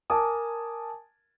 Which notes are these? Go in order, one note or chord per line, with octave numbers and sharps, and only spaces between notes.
A#4 G#5 A5 D6 D#6